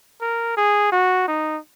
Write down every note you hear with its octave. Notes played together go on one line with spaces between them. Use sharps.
A#4
G#4
F#4
D#4